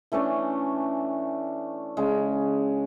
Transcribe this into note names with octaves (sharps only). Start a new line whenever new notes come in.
E3 A3 C#4 D4
C#3 G#3